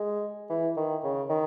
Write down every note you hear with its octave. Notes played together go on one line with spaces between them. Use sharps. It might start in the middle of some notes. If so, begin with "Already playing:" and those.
Already playing: G#3
E3
D#3
C#3
D#3